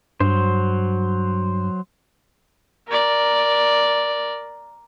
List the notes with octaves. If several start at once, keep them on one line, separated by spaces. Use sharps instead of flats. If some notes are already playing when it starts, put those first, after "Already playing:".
G2 F#3 C5
A#4 D5